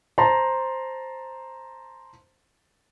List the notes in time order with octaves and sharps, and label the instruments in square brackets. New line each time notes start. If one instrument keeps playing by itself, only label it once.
[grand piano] C5 A5 A#5 C6